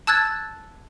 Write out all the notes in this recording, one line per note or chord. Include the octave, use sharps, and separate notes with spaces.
A5 E6 F#6 G#6 A6